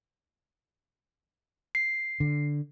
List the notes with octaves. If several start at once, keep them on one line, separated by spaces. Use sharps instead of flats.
C7
D3